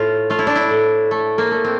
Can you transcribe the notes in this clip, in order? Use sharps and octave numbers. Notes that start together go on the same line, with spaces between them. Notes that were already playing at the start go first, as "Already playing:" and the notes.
Already playing: A2 A3 F4
A3 F4
E4
D4
E4
A2
A3
A#3
A3
C4